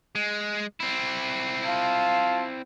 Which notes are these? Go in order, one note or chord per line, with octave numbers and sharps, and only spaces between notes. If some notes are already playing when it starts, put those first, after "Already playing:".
G#3
C4 E4
F4 F5 A5